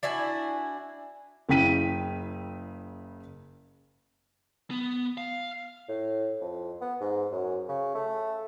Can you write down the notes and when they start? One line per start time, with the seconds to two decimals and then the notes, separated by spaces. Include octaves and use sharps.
0.03 D4 E4 F#4 G#5
1.49 F#1 C#3 E4 G5 B6 D#7
4.70 B3
5.18 F5
5.88 A2
6.41 F2
6.81 B3
7.01 G#2
7.32 F#2
7.68 C#3
7.95 A3